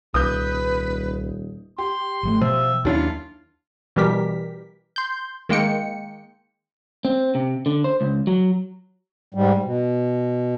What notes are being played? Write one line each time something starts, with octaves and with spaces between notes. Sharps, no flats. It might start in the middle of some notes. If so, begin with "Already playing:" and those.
D#1 C2 B4 D#6 G6
G4 C6
G#1 F3 A3
B2 F3 E5
D#2 F#3 C#4 D4 E4 F4
B2 E3 G3 G4 A#4 B6
C6 G6
D#3 G#3 A#3 G5 C#7
C4
C3
D3
C5
C#2
F#3
G#2 G3
B2